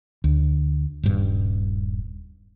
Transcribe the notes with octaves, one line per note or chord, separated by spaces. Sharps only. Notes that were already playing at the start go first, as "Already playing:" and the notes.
D2
D#1 G2